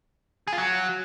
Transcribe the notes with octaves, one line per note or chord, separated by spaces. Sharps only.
G#4
F4
F#3